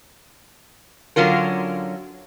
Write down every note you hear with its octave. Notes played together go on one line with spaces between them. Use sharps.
D3 F#3 C#4 F4 A#4